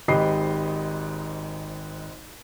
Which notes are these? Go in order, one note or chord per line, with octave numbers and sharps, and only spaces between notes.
G#1 G#2 G4 D#5 B5 C7